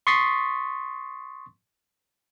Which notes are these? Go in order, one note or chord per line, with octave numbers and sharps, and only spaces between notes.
C6 C#6 D#6 A6 B6 C7